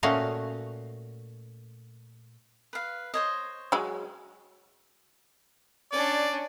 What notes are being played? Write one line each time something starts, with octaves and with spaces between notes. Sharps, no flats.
A#2 A3 C#4 F#4 D#5 F5
B4 F5
C5 C#5 D#5
F#3 G#3
C#4 D4 D5